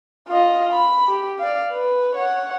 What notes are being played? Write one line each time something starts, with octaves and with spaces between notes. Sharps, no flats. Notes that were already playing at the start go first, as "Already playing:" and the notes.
F4 D#5
B5
G4
D5 F5
B4
C#5 F#5